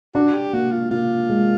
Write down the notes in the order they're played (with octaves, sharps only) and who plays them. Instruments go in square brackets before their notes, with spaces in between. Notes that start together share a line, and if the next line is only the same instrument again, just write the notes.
[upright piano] D4 [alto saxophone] F#4
[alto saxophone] G4
[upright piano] A#3 [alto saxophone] F#4
[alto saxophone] F4
[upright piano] A#3 [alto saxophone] F4
[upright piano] G#3